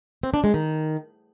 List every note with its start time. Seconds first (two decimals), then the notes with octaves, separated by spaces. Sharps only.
0.23 C4
0.34 D4
0.44 G#3
0.54 D#3